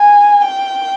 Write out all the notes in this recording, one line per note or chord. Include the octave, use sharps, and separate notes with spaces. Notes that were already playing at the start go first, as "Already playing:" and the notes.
Already playing: G#5
G5